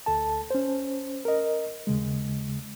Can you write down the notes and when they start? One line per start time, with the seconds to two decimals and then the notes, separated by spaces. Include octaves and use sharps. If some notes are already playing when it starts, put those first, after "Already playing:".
0.06 D2 A4 A5
0.51 C#4 C5
1.25 A#4 D#5
1.87 D#2 C#3 G#3